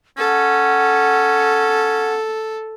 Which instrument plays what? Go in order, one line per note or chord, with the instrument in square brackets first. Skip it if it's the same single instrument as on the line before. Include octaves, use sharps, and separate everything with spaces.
[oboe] C#4 [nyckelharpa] A4 [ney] F#5